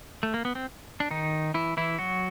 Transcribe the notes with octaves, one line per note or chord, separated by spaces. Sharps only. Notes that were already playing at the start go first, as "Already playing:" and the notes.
A3
A#3
B3
C4
D4
D#3 D#4
E3 E4
E3 E4
F#3 F#4